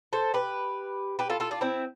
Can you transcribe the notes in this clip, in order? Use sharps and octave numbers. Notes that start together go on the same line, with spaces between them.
A4 C5
G4 B4
G4 B4
F4 A4
F4 A4
D4 F4
C4 E4